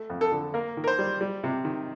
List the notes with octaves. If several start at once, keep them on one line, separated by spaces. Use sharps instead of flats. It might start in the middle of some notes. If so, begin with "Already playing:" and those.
Already playing: A3
F2
A4
D3
A#3 A#4
D#3
A#4
C5
G3
G3
C3
D#3